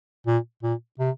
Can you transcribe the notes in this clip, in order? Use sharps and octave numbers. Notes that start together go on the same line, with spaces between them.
A#2
A#2
C3